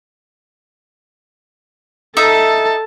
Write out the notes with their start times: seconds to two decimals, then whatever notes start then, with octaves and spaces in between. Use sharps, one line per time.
2.17 D#4 A4 E5 A5 D#6